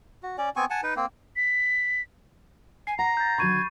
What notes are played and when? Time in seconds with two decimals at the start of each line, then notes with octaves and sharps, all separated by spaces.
0.23 F#4
0.38 C#4 D5
0.56 B3 C4 G#5 C#6
0.70 F#5 G#5 A5
0.83 D#4 B4
0.97 A#3 C4
1.36 B6
2.87 G#5 C7
2.99 F#5 A#5 A#6
3.17 G6 A6
3.38 D3 D#3 F#3 B5 C#6 G#6 D#7